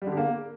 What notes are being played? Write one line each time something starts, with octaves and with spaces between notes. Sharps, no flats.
G3
D3
G4
A#3